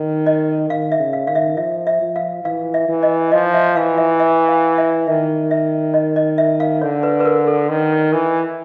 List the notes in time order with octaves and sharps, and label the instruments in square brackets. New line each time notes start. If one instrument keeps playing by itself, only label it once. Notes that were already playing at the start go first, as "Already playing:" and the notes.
Already playing: [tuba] D#3
[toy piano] D#5
[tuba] D#3 [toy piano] F5
[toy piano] E5
[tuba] C#3
[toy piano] F5
[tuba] D#3 [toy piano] F5
[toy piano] E5
[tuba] F3 [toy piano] E5
[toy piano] E5
[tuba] F3
[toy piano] F5
[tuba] E3 [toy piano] F5
[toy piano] E5
[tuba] E3
[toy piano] D#5
[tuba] F3 [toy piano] D#5
[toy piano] E5
[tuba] E3 [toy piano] F5
[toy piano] E5
E5
F5
E5
[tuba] D#3 [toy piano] E5
[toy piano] E5
D#5
D#5
E5
F5
[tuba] D3 [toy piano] C#5
[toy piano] B4
B4
A#4
A4
[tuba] D#3
E3